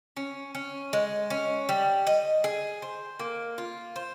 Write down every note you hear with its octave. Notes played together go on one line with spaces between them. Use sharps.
C#4
C#4
G#3
C#4
G3
D#5
G#4
C5
A#3
F4
C5